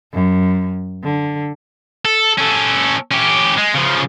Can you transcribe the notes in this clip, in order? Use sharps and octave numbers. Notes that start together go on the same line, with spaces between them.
F#2
D3
A4
C#4 A4
C#4 G4
G#3
C#3 F3